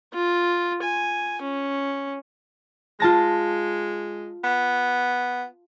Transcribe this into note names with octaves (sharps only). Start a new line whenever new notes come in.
F4
G#5
C#4
G#3 F4 A5 A#6
B3